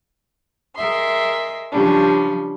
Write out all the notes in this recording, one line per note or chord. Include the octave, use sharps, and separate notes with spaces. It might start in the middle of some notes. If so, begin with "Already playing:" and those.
G#4 A#4 D#5 E5 C6
C#3 F3 G3 C#4 D4